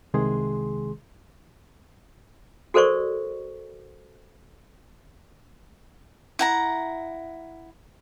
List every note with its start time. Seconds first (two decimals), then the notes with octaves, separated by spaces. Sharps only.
0.14 C2 C3 D#3 G#3 G#4 C6
2.74 F#4 A4 A#4 C5 D5 C#6
6.39 E4 F#5 A#5